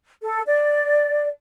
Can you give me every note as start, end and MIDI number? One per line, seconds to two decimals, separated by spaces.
0.22 0.41 69
0.47 1.28 74